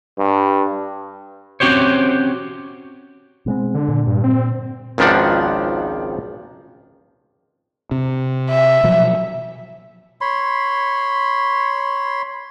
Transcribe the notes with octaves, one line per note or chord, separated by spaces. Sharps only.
G2
C4 C#4 F#4 G4 C5 C#5
B2 G#3 C4
D3
A#2
G2
C4
G#1 C#2 D#3 F3 D4 F#5
C3
E5
B2 F3 F#3
C#5 B5 C6